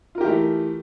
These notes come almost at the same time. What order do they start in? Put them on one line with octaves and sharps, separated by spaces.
F4 A#4 G4 E3 A3